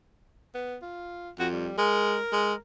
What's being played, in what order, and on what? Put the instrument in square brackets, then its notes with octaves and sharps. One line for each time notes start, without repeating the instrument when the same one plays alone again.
[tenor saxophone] B3
F4
[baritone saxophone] F2 [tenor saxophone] F#4
[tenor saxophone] G3
[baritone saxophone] G#3 [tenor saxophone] A#4
[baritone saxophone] G#3